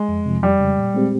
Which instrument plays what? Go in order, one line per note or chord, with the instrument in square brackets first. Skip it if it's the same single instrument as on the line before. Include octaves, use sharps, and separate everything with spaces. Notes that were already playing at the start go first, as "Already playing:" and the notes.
Already playing: [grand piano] G#3
[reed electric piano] F2
C3 F3
[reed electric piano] F2 [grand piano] G3
[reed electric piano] C#3 G#3
A#2
G#3 C4 G4